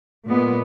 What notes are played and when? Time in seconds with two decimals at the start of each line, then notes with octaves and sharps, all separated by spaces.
0.27 A#2 G#3 B3